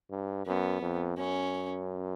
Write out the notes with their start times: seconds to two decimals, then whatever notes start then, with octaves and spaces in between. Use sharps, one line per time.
0.11 G2
0.46 F#2 B3
0.82 F2
1.17 F#2 C#4